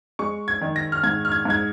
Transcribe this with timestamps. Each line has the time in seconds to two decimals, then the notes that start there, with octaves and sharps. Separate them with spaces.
0.19 G#3 C#6
0.48 G#6
0.61 D#3
0.76 A#6
0.92 F6
1.03 G#2 G#6
1.25 F6
1.32 G#6
1.45 G#2 G#6